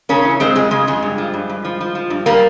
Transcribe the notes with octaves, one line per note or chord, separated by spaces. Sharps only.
C#3 A#3 C#4
E3
C#3 G#3 C4
F2 G#3
C#3 G#3
F2 G#3
G2
F3
G2
G2
F3
F3
F3
G2
F3 G3 A#3